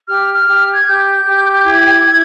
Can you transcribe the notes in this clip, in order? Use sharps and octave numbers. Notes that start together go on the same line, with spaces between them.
G4 F6
F6
G4
G#6
G4 G6
G4
E4 G#6
E4